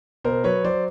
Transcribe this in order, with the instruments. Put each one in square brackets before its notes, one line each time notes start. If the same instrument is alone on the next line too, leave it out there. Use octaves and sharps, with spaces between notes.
[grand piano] B2 A#4 C5
F#3 B4 C#5
F#3 C5 D5